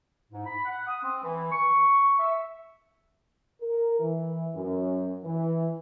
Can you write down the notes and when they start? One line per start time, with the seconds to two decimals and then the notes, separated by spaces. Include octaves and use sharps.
0.31 G#2
0.45 B5
0.65 F#5
0.87 D#6
1.03 C4
1.23 E3
1.51 C#6
2.19 E5
3.61 A#4
3.99 E3
4.55 F#2
5.24 E3